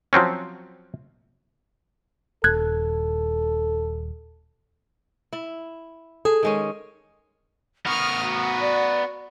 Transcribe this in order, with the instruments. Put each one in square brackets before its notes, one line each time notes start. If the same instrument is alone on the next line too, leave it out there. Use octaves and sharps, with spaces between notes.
[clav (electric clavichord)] F3 F#3 C4 C#4
[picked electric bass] D#1 [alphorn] A4 [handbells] F#6 G#6
[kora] E4
[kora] G#4 [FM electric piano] A4
[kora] D#3 G#3 C#4
[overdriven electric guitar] B3 A#4 [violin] C#6 F6 [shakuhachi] D#6
[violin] F#4
[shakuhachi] D5